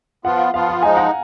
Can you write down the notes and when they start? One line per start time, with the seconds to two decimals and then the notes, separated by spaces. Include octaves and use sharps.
0.25 F3 B3 F4 F#5
0.53 F3 B3 F4 F5
0.68 F#5
0.82 F3 G#3 D#4 F5 G#5
0.97 F#5 A#5